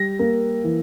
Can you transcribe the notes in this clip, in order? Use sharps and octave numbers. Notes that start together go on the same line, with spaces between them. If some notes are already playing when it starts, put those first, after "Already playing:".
Already playing: G3 A#6
A#3
E3